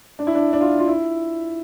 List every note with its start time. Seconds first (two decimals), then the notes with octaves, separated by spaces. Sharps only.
0.19 D4
0.27 E4
0.35 D4
0.53 D4
0.61 F4
0.79 F4
0.87 E4